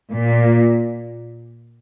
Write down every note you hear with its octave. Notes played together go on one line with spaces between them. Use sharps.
A#2